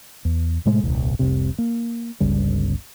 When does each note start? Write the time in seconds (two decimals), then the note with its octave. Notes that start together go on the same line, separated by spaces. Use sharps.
0.25 E2
0.66 A2 C3 G#3 A3
0.84 D#1 C2
1.19 F1 C2 C3
1.58 A#3
2.20 G1 C#2 C#3 G3